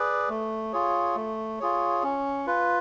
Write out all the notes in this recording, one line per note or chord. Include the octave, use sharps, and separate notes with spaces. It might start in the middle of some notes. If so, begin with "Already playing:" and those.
Already playing: G#4 B4 D5
A3
F4 G#4 C#5
A3
F4 G#4 C#5
C#4
F4 B4